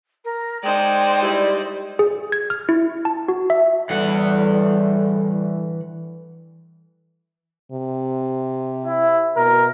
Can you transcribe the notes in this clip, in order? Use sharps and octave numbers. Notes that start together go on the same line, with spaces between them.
A#4
G#3 D#4 C5 D5 G5
G3 E4
G#4
G#6
F6
E4
A5
F#4
E5
A2 D3 E3 G3 F#5
C3
E4
B2 A#4